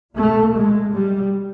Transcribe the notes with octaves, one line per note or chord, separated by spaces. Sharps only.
A#2 A3
G#3
G3